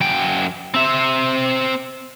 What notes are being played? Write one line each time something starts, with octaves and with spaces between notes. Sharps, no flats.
F#2 G5
C4 E5